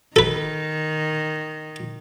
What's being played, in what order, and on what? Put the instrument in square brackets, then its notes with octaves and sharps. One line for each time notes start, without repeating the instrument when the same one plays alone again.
[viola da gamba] D#3 [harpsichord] A4 B4